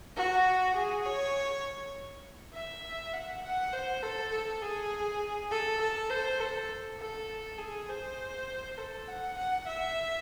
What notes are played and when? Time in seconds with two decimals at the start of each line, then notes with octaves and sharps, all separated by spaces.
0.16 F#4
0.76 G#4
1.05 C#5
2.54 E5
3.13 F#5
3.43 F#5
3.73 C5
4.02 A4
4.32 A4
4.62 G#4
5.51 A4
5.81 A4
6.10 C5
6.40 A4
6.99 A4
7.58 G#4
7.88 C5
8.77 A4
9.07 F#5
9.37 F#5
9.67 E5